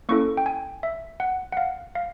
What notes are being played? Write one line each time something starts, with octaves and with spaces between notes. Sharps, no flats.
A#3 C#4 E4 A4 C#6
G5
G#5
E5
F#5
F#5
F5
F5